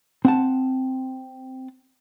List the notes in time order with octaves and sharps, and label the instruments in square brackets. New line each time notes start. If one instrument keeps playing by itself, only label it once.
[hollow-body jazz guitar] C4 F#5 A5